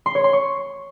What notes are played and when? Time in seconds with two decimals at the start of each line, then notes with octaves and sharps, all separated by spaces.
0.06 C6
0.15 C#5
0.24 C6
0.33 C#6